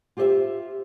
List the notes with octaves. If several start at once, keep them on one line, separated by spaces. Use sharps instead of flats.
F4 G4 C5 D#5 E5